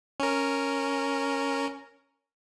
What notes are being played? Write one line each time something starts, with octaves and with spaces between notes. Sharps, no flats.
C#4 A#4